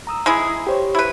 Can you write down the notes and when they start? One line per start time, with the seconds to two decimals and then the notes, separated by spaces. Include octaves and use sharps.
0.07 A#5 D#6 E6
0.26 G#3 E4 G#4
0.67 G4 C5 C#5
0.95 E4 B4